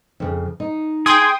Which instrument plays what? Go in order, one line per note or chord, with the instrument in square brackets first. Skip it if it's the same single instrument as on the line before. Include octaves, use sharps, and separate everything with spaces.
[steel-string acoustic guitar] F2 C#3
D#4
[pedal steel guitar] G#4 [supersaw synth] G5 C6 D#6